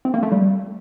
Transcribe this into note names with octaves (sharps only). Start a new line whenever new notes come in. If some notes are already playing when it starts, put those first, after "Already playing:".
C4
A#3
A3
G3